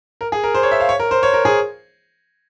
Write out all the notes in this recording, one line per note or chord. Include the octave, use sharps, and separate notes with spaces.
A#4
G#4
A#4
C5
C#5
E5
F5
C#5
A#4
C5
C#5
A#4
G#4